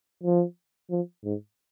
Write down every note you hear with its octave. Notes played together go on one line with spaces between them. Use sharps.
F3
F3
G#2